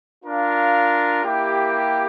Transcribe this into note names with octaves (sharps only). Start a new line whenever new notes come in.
D4 F4 A#4 F5
A#3 E4 G4